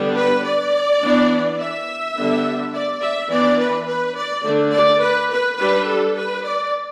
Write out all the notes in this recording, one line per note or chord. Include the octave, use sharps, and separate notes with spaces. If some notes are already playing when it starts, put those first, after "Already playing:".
Already playing: D3 G3 B3 D4
B4
D5
E3 B3 D4
E5
D3 G3 B3 D4
D5
E5
E3 B3 D4 D5
B4
B4
D5
D3 A3 D4
D5
B4
B4
G3 D4 B4
A4
B4
D5